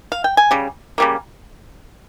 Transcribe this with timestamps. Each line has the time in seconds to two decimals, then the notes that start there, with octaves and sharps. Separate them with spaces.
0.12 F5
0.24 G5
0.37 G#5
0.51 C#3 G3
0.98 C#3 G3 A#3